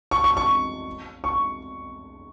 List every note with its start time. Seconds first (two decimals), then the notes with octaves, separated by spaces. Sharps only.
0.11 C#6
0.24 C#6
0.37 C#6
1.24 C#6